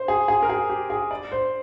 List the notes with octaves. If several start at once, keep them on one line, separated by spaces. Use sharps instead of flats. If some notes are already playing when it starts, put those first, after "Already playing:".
Already playing: C5
G#4
G#4
A#4
G#4
G4
G#4
D5
C5